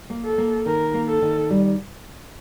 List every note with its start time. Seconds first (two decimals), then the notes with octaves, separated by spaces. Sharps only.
0.10 A#3
0.25 A4
0.38 A#3
0.66 D#3 A#4
0.94 A#3
1.08 A4
1.22 D#3
1.50 G3